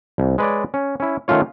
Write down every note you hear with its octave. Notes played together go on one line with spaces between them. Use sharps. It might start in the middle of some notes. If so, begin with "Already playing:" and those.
C2
G#3 B4 C#5 D5
C#4
C#4 E4
D#3 A3 C#4 F4 C#5